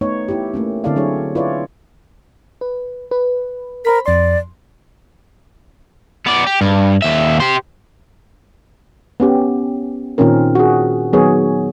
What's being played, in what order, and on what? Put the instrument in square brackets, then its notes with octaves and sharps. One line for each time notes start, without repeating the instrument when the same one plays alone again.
[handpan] A3 B3 D#4 C#5
B3 E4 G4
A3 A#3 C#4
D3 C4 E4 A4 D5 F5
F#3 D4 E4 G#4 C#5
E4 F4 G#4 B4 C#5 D5
[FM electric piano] B4
B4
[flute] A#4 [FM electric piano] C5 B5 B6
[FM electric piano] F2 C6 [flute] D5
[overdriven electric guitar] B3 D5
G4
G2
D#2 E5
G4 C5
[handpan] B3 C#4 G4
A#2 D#3 C4 C#4 A#4
F#4 G#4
D#3 F#3 B3 G#4 C#5